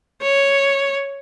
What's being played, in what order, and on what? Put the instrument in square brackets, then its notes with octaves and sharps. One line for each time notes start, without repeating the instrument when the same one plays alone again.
[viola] C#5